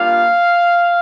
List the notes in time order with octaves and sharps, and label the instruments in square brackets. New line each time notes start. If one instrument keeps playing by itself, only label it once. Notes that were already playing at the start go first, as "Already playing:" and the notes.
Already playing: [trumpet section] G3 A#3 D4 F4 F5